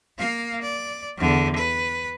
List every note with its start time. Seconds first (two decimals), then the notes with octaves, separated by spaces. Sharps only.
0.17 A#3 F5
0.62 D5
1.18 E2 D3
1.56 B4